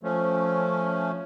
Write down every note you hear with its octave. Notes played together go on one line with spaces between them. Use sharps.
F3 A3 C#4